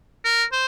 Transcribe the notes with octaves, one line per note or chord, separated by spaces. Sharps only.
A#4
C5